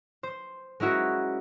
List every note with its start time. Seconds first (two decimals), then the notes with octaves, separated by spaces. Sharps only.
0.23 C5
0.80 G#3 C#4 E4 F#4 A#4